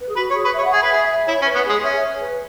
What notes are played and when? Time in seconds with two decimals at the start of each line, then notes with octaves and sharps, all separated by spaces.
0.01 B4
0.09 G#4
0.16 F#4 B4
0.30 C#5
0.35 G#4
0.45 B4
0.54 C#5 E5
0.65 F#5
0.73 G#4 E5
0.82 B4
0.92 G#4
1.27 E4 C#5
1.42 C#4
1.46 B4
1.55 B3
1.65 G#3 G#4
1.83 C#4 E5
2.02 C#5
2.20 B4